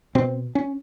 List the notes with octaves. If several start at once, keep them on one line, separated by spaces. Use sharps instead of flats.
B2 C4
C#4